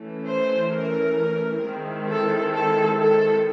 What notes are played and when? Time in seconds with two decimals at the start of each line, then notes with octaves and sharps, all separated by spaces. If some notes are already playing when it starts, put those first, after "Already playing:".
Already playing: E3 A3 C#4
0.26 C5
0.71 A#4
1.62 D#3 G#3 C4 E4
2.09 A4
2.53 A4
3.00 A4